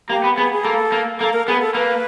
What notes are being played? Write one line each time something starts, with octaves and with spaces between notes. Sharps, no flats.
A#3 G4
B3
B3 G#4
G#4
A#3 A4
A#3
A#3 A4
A#4
B3 G#4
A4
A#3 B4